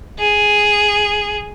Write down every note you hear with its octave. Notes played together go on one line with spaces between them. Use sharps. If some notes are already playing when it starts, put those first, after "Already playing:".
G#4